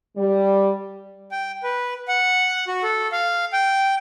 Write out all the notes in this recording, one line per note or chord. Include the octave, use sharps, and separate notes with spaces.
G3
G5
B4
F#5
F#4
A4
F5
G5